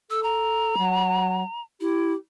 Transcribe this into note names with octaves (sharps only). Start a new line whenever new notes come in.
A4 E6
A#5
F#3
E4 G4